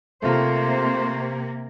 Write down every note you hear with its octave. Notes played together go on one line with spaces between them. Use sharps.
C3 A3 A#3 F4 C5